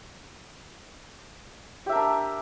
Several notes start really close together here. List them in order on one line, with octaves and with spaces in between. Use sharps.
G4 E5 A#4 D4